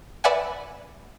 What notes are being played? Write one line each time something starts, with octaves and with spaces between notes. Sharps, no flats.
B4 D5 E5 F#5 G#5